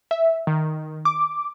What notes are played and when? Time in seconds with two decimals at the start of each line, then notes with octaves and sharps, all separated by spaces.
0.11 E5
0.47 D#3
1.05 D6